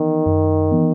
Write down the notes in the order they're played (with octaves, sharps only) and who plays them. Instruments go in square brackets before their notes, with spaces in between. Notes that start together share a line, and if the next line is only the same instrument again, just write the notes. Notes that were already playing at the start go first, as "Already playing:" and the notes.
Already playing: [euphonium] D#3 [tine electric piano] E3 B3
[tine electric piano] F#2
E3 B3